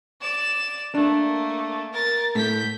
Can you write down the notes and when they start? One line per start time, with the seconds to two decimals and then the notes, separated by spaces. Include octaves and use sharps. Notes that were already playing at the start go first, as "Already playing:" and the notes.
0.21 D5 E7
0.95 A3 A#3 D4
1.93 A#4 A6
2.35 A2 G6 B6